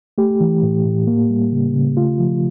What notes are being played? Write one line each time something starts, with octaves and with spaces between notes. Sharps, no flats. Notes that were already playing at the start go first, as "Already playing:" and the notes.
A3 G4
E3
A2
A2
A#3
G3
C#3
C#3
A3 F4
F3